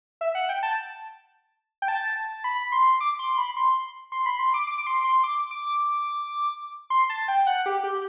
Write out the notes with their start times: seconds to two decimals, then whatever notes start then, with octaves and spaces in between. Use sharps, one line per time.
0.21 E5
0.35 F#5
0.49 G5
0.63 A5
1.82 G5
1.88 A5
2.44 B5
2.72 C6
3.00 D6
3.19 C6
3.38 B5
3.56 C6
4.12 C6
4.26 B5
4.39 C6
4.54 D6
4.67 D6
4.78 D6
4.87 C6
5.04 C6
5.24 D6
5.51 D6
6.90 C6
7.10 A5
7.28 G5
7.47 F#5
7.66 G4
7.84 G4